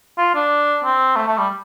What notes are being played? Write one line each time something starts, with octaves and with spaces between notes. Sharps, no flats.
F4
D4
C4
A3
A3
G3